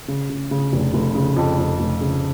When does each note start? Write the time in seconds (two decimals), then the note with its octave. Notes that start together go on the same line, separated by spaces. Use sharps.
0.08 C#3
0.30 C#3
0.51 C#3
0.73 F1
0.94 F1
1.15 C#3
1.36 F2
1.58 F2
1.79 F1
2.01 C#3